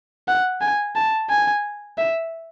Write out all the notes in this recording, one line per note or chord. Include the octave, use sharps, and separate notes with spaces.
F#5
G#5
A5
G#5
E5